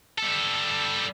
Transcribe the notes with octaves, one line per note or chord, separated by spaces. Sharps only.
G3 A4